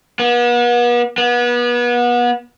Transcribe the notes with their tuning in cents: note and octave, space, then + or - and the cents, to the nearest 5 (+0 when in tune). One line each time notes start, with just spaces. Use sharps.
B3 -40
B3 -30